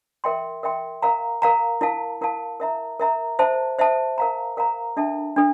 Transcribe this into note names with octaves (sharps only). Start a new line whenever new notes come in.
A#4 E5 G5 C6
A#4 E5 G5 C6
A#4 F5 A#5
A#4 F5 A#5
E4 A#4 F5 A5
E4 A#4 F5 A5
A#4 E5 A#5
A#4 E5 A#5
C5 E5 A5
C5 E5 A5
A#4 F5 A#5
A#4 F5 A#5
D4 A4 E5 A5
D4 A4